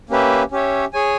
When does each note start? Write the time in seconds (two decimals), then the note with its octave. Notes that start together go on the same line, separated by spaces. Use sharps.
0.10 A#3 C#4 G4 B4 E5
0.52 C#4 G4 C#5 E5
0.93 G#4 C#5 G#5